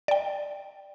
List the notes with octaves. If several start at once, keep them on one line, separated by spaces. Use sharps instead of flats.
D5 G5